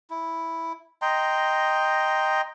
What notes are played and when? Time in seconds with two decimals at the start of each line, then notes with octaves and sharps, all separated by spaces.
0.10 E4
1.02 D#5 G5 A#5 C6